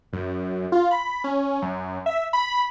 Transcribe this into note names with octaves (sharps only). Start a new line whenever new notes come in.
F#2
F4
B5
C#4
F#2
E5
B5